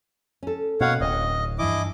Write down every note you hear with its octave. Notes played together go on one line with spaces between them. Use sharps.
C#4 A4
B2 A#3 C#4 C#5 F5 F#5
D1 D#5
G2 E3 E4 D#5 D6